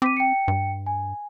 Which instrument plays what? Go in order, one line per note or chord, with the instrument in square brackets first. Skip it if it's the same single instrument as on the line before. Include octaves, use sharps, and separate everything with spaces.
[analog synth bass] C4 [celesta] D6 B6 D#7
[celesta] G5 C#7
[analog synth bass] G2
[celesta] G#5